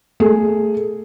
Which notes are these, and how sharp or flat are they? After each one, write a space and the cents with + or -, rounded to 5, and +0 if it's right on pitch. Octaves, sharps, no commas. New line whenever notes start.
A3 +15 G#4 +0